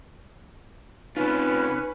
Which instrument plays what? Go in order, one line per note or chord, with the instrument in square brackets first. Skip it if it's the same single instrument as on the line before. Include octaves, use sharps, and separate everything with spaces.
[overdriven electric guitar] C3 F4 [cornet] C#4 [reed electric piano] D#4 [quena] B4